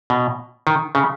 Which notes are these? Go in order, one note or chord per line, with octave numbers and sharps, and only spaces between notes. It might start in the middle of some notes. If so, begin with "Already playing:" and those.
B2
D#3
C#3